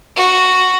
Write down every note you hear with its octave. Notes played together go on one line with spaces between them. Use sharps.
F#4